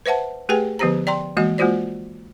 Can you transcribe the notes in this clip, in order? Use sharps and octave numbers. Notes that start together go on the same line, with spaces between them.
B4 C5 E5 F#5 A5
A3 G4 G#4 B4 G5 G#5
D3 F3 B3 G4 C5 A#5
D5 G5 A#5 C6
E3 G#3 A#3 F#4 D#5
G#3 A#3 F4 F#4 C5 D5